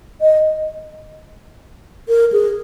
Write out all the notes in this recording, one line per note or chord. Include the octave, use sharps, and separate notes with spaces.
D#5
A#4
G#4